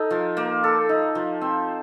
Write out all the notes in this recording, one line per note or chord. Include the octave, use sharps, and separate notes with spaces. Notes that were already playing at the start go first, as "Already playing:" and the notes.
Already playing: D#4 A4
F3
A#3
A4
D#4
F3
C4